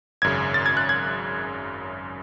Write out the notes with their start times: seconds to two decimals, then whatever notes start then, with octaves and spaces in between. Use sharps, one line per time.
0.22 G#1 F#2 C#3 G#6
0.54 A6
0.66 G#6
0.77 F#6
0.89 G#6